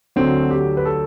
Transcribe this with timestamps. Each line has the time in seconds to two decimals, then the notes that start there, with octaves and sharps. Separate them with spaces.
0.16 D2 D3 F#3 C4
0.51 G4
0.77 B4
0.85 A4